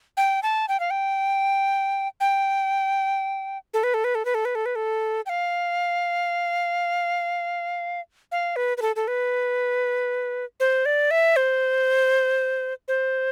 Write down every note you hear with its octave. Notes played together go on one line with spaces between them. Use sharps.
G5
A5
G5
F5
G5
G5
A4
B4
A4
B4
A4
B4
A4
B4
A4
B4
A4
G5
F5
F5
B4
B4
A4
A4
B4
C5
D5
E5
C5
C5